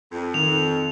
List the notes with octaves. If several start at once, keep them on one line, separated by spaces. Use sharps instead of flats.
F2
D#3 F7